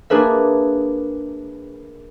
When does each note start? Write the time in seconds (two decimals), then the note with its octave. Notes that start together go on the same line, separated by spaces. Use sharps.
0.10 A#3 D4 G#4 A#4 B4 E5